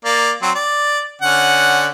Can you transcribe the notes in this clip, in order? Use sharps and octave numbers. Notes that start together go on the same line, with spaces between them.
A#3 D5
F#3 C4
D5
D3 C#4 F#5